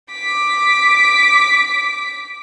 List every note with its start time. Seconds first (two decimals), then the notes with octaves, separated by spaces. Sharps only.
0.12 D6 B6